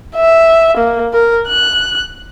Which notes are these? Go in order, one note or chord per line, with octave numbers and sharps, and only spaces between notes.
E5
A#3
A#4
F#6